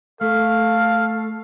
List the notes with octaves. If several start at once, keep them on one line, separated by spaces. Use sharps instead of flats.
A3 A4 F5